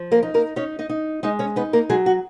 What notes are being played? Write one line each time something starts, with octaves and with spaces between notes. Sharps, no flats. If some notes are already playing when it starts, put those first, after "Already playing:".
Already playing: F3
A#3 A#4
D#4
A#3 A#4
C#4 D#4 C#5
D#4 D#5
D#4
G#3 D#4 D#5
C#4 C#5
B3 D#4 B4
A#3 A#4
F#3 G#3 G#4
F#4